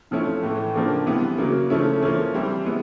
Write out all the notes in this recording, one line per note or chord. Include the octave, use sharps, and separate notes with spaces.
C3 F3 A3 C#4 E4
A2 E3 A3
C#3 F3 A#3 D4
C3 E3 G3 B3 E4
C#3 F#3 A#3
C#3 F3 A3 C#4 E4
F3 A#3 C#4 E4
E3 G3 C4 E4
G#3 B3 E4